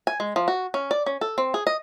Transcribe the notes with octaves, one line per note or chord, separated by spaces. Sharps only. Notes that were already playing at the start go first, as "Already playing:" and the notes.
G#5
G#3
F3
F#4
C#4
D5
C#4
A4
C4
G#4
D#5